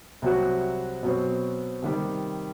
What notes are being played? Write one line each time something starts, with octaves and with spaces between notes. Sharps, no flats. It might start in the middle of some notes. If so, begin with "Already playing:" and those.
C2 C3 F#3 C4 F#4
B2 F#3 C4
C3 D#3 G3